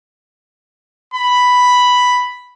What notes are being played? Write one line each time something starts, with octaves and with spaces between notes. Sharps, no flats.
B5